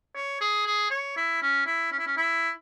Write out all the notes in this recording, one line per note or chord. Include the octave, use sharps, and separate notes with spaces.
C#5
G#4
G#4
C#5
E4
C#4
E4
C#4
E4
C#4
E4